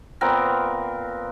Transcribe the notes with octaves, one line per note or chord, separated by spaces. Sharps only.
A#2 B3 C4 A#4